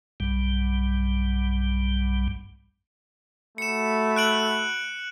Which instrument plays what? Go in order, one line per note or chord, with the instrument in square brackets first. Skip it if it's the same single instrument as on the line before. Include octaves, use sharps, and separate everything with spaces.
[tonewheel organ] B1 G2 G3
[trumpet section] A3 F#4 B5 [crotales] C#7 E7
[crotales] F#6 D7 F#7